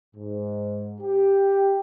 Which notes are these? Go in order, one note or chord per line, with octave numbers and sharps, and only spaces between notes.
G#2
G4